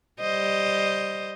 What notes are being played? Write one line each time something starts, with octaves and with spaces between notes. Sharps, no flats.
G3 C5 D#5